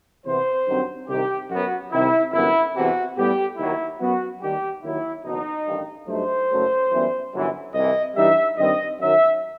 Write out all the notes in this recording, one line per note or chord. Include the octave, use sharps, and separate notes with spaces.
E2 C3 E3 B3 C5
G2 D#3 F#3 C4
C2 C3 D#3 G4
F#2 F#3 B3 F#4
C2 C3 D#3 E4
G1 F#2 E3 B3 E4
E2 C3 E3 F#4
A2 G3 B3 G4
D#2 D#3 F#3 E4
F#2 F#3 B3 F#4
D#2 D#3 G3 D#4 G4
D#2 D#3 F#3 E4
F#1 E2 B2 F#3 D#4
A1 G2 D#3
G2 F#3 A3 D#4 C5
F#1 F#2 F#3 A3
F#2 E3 G3 B3
G1 F#2 E3
C2 C3 E3 D#5
G2 E3 G3 D#4 E5
G2 D#3 G3 C4 D#5
F#2 D#3 F#3 E5